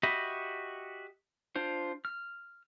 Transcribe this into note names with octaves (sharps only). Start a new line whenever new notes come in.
F#4 G4 D#5 E5 B5
D4 F4 C5
F6